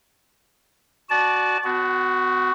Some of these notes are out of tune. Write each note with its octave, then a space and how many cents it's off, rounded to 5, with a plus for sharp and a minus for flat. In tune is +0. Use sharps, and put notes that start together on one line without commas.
F#4 +0 D5 +5 A5 -25
B3 +45 F#4 +0